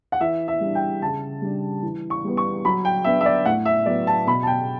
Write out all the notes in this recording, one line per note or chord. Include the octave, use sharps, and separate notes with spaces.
F#5
E3 E5
E5
G3 D4
G5
C#3 A5
G3 D4
E3
C#6
G3 B3
C#6
F#3 B5
G5
B3 D4 E5
E5
D5
A2 F#5
E5
F#3 B3 D5
A5
B2 B5
A5
G5